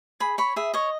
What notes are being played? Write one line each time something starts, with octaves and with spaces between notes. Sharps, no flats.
G#4 B5
C#5 B5
G#4 E5
C#5 D#5